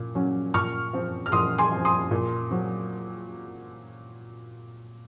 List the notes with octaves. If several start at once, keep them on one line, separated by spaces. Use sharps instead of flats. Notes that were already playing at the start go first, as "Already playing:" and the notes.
Already playing: A#2
F#3 C#4
A#2 C#6 F6
F3 C4
F6
A#2 C6 D#6
G#5 C6
F3 C4
C6 D#6
A#2
F#3 C4